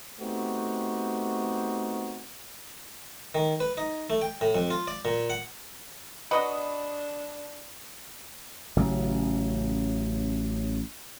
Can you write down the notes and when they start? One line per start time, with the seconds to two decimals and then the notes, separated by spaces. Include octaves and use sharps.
0.19 A3 B3 C4 D#4 F#4 G4
3.35 D#3
3.60 B4
3.77 D#4
4.10 A3
4.22 G5
4.41 A2
4.55 F2
4.70 F4
4.87 D5
5.05 A#2
5.30 F#5
6.31 D4 F#4 B4 D#5 B5 C#6 D#6
8.77 A1 C#3 F#3